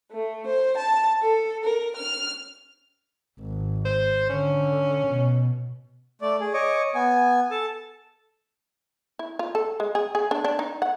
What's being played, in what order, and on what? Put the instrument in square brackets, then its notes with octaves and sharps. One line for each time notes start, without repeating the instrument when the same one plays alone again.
[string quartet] A3
C5
A5
A4
A#4
F6
[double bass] G#1
[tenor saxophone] C5
[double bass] D3 [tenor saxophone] C#4
[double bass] B2
[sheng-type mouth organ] A3 D5
G#4
C#5 D#5 D6
B3 G#5
A4 A5
[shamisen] E4
F4
A4
G#3
G#4
G#4
D4
D4
D#4
F#5